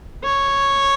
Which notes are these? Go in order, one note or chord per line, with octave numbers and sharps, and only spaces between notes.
C#5